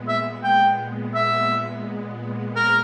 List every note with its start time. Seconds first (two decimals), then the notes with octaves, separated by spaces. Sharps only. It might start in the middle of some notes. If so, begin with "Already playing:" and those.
Already playing: A#2 G#3 B3
0.08 E5
0.44 G5
1.15 A#2 G#3 B3 E5
2.56 A#4